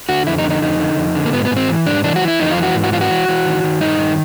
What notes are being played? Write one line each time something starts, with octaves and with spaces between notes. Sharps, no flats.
D3 F#4
F2 E4
D#4
D3
D#4
F2 D#4
D3
F2
D3
A#3
G#2 B3
B3
G#2
C4
E3
G#2 D4
E3 D4
F#4
E3
E4
F2 D#4
F4
E3
F#4
G#2
F#4
E3 F4
F#4
E3
E3
D#3
D#3
G2 D#4
D#3